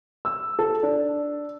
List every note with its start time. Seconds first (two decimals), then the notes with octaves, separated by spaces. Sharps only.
0.25 E6
0.59 A4
0.83 D4